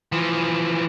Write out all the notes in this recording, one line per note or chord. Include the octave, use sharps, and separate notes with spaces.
E3 F3